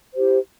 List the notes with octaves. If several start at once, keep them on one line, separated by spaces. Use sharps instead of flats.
E4 G4 C5